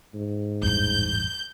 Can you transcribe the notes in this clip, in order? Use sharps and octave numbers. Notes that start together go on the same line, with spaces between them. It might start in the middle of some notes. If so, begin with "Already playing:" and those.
G#2
A1 E2 G2 G6